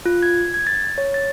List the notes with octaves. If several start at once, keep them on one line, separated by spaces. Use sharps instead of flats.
F4
G#6
G#6
A6
C#5
A6